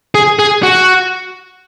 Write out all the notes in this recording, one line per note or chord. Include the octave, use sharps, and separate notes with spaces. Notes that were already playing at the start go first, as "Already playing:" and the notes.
G#4
G#4
F#4